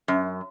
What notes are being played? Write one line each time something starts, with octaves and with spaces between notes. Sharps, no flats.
F#2